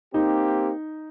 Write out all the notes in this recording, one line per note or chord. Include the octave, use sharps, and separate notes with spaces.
A#3 C4 D#4 G4